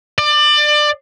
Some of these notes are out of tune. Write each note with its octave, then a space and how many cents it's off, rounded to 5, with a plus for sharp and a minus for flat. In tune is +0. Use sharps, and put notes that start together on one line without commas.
D5 +25